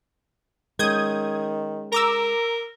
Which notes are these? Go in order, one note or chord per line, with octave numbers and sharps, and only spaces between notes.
D#3 G#3 C#4 D#6 G6 G#6
A#4 A#5 D6 E6